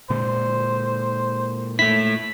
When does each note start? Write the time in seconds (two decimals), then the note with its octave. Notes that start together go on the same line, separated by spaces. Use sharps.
0.10 A#2 D3 G#3 C5
1.79 A3 E4 B6